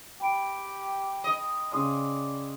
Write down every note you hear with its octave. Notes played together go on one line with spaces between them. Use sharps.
G4 G5 B5 D7
D#5
C#3 D5 C6 D#6